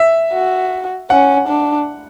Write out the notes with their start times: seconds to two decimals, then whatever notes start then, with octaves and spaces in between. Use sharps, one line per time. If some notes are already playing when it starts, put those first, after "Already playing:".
Already playing: E5
0.33 F#4
1.10 C#4 F#5
1.48 D4